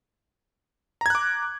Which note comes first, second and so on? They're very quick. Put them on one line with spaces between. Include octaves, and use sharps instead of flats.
A#5 G#6 F#6 D6